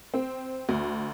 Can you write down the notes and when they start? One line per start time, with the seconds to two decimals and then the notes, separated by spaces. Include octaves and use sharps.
0.14 C4
0.69 D2